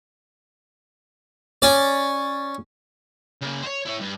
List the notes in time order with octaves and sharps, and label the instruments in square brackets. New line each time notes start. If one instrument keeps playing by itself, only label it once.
[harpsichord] C#4 D5
[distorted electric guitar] C#3 A#3
C5 C#5
E4 C#5
G2